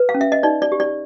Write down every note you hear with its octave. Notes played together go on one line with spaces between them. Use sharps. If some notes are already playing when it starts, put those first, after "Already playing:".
Already playing: B4
F5
C#4
E5
D#5
D#4 D5
D5
G4
D5